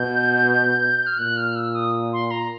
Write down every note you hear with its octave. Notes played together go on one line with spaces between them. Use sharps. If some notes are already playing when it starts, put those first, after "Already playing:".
Already playing: B2 G6
F6
A#2 F#6
F6
E6
D#6
C6
A#5